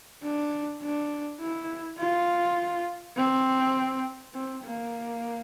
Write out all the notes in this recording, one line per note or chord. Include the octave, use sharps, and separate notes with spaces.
D4
D4
E4
F4
C4
C4
A#3